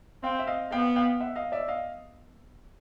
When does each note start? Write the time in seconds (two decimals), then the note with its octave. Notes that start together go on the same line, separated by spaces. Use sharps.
0.23 C4 F5 G5
0.39 E5
0.47 D#5 F5
0.72 B3 F5 G5
0.96 F5 G5
1.20 E5 F#5
1.36 D#5 F5
1.52 D5 E5
1.68 D#5 F5